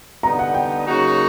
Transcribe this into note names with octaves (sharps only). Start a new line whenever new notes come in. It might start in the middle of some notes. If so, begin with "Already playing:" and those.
D3 G3 B3 D#4 A#5
F#5
G5
C#3 F#3 A#3 D#4 F#4